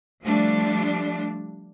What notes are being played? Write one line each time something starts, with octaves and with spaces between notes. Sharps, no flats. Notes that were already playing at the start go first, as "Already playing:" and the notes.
F3 G3 A3 D4